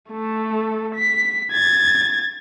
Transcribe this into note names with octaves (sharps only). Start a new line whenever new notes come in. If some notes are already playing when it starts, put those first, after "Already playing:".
A3 A4
B6
G#6 A6